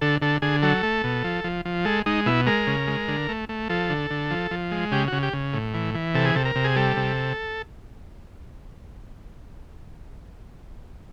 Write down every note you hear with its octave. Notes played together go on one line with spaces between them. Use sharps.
D3 A4
D3 A4
D3 G#4
F#3 A4
A3
B2
F3
F3
F3
G#3 A4
G#3 D#4
B2 E4
G#3 A#4
C#3
G#3
D3
A3
A3
F3 A4
D3
D3
F3
F3
G#3
C#3 G4
C#3 F#4
G4
C#3
A2
E3
E3
C3 A4
G#4
C3 A4
A#4
C3
G#4
G3 A4
C3